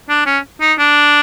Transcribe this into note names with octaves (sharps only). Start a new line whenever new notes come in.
D4
C#4
D#4
D4